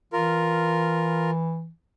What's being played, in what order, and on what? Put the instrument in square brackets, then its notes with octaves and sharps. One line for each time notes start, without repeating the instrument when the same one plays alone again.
[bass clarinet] E3 [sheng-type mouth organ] F4 A#4